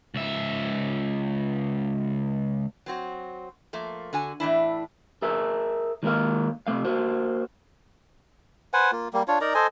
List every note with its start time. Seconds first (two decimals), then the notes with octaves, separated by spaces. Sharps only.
0.15 C#2 E5
2.86 F#3 C4 F#4
3.73 F3 A3 A#3
4.13 D3 F#4 G#5
4.40 A2 E3 D4 E4
5.22 G#4 A#4 E5
6.03 D#3 G#3 A#3 A#4 F5
6.67 C3 A3 F5
6.85 A#3 F#4 C5
8.73 B4 C5 F#5 G#5
8.92 A#3 F4
9.13 G3 A#3
9.28 D4 F4 C#5
9.41 D#4 A#4 D5 A#5
9.55 A4 C5 D#5 G#5